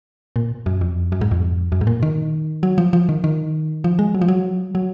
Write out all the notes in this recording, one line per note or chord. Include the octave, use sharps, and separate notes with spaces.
A#2
F#2
F2
F#2
G#2
F2
F#2
G#2
A#2
D#3
F#3
F3
F3
D#3
D#3
F3
G#3
F#3
F3
F#3
F#3